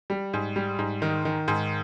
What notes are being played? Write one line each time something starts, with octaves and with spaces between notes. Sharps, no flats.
G3
G#2
G3
G#2
D#3
D#3
G#2